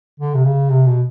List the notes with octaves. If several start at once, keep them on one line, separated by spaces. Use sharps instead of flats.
D3
C3
C#3
C3
B2